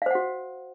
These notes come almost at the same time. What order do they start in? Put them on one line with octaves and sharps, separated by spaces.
F5 C5 F#5 F#4